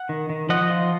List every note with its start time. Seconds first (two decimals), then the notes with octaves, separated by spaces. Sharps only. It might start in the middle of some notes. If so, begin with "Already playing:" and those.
Already playing: F#5
0.09 D#3
0.29 D#3
0.49 F3 D#5 F#5
0.70 F4